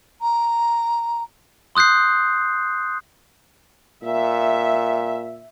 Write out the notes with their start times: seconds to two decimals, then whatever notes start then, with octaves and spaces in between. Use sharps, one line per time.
0.21 A#5
1.75 C6 D#6 F#6 G6 C7
4.04 A#2 E5